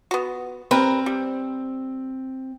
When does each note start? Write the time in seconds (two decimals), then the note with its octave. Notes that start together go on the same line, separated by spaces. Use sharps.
0.11 B3 F#4
0.71 G3 C4 A#4 B4
1.06 G3